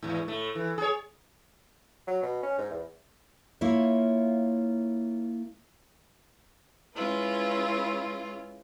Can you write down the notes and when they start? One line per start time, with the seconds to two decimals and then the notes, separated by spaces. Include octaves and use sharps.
0.03 E2 G#2
0.28 A2 A3
0.55 E3
0.78 G#4 C#5
2.07 F#3
2.23 B2
2.43 C#4
2.58 G#2
2.71 E2
3.61 A#3 E4 F4 C#5
6.95 G#3 C#4 E4 F4 B4